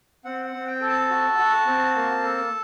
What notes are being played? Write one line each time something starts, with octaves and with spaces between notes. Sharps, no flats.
C4 F#5
F#5
C4
G5
A4
A5
F#4
F#4
C4
A#3
A4